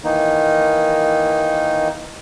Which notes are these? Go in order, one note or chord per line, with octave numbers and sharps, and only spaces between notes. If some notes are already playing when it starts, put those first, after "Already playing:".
D#3 E3 A#3 D#4